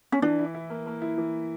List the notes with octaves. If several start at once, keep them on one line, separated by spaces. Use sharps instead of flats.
C#4
E3 D4
E4
E4
A#3
A#3
E4
E3